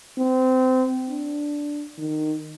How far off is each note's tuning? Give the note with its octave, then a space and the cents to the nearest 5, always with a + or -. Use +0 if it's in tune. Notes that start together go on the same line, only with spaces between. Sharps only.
C4 -25
D4 -5
D#3 -15